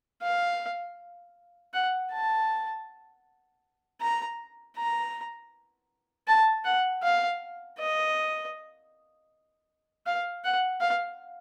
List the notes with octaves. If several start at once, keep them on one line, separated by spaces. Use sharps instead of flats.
F5
F#5
A5
A#5
A#5
A5
F#5
F5
D#5
F5
F#5
F5